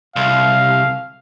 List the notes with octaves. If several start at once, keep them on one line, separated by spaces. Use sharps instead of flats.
C2 F5